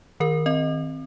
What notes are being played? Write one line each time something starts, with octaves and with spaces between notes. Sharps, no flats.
D#3 A#4
C4 D#5